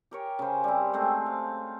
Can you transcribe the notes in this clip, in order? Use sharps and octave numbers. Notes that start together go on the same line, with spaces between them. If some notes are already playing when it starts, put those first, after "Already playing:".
G4 A#4 C#5
C#3 C5
G3 C4
G#3 A3 C4
F5